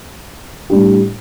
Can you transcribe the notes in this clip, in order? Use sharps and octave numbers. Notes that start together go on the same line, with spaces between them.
A2 G3 D4 G4